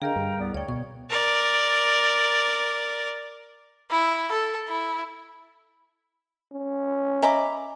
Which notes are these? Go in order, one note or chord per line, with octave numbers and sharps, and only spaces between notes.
D3 G#4 A#4 D#5 F5 G5 A#5
G2
C2 B3 D5
D2 C#5 D5 G5
B2 C#6
A#4 D5
E4
A4
E4
C#4
D#5 E5 G#5 A#5 B5 D6